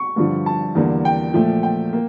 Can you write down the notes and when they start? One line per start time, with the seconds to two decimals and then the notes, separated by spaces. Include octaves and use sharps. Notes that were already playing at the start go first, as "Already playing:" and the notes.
Already playing: C#6
0.16 G2 D3 F3
0.46 A5
0.75 E2 D3 G3 A#3
1.05 G5
1.34 A#2 F3 A3
1.63 G5
1.93 A#3